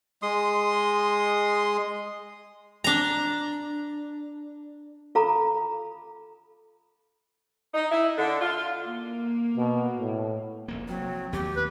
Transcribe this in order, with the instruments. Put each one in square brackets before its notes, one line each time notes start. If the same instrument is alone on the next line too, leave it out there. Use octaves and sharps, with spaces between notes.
[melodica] G#3 C6 D#6
[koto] D4 A#5
[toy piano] F4 A4 F5 A#5 B5 D6
[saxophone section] D#4
E4
D3
F4
[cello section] A#3
[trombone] B2
A2
[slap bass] F1 A#1 A#3
[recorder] F#3 [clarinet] C4
[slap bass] D#2 A3 B3 [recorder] G4
[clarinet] B4